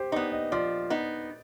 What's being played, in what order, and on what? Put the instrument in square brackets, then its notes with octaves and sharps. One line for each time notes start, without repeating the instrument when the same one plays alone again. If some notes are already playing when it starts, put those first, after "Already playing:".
Already playing: [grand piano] G4 C5
[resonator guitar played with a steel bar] B3 D#4 [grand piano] D5
[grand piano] D#5
[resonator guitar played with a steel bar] F3 [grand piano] D5
[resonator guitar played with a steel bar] B3 D#4